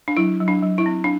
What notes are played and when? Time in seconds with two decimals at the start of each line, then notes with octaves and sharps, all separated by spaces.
0.08 D4
0.17 F#3 E4
0.41 F#3
0.48 D4
0.62 F#3
0.78 E4
0.86 C4
1.04 D4